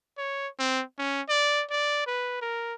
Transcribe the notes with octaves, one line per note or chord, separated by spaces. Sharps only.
C#5
C4
C#4
D5
D5
B4
A#4